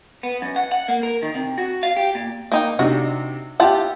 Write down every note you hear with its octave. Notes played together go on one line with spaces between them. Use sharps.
B3
F#2
F#5
F#5
A#3
A#4
D#3
C3
F#4
F5
G4
A#2
A#3 D#4 G5
C3 D4 D#4 F#4
E4 F4 G4 F#5 A5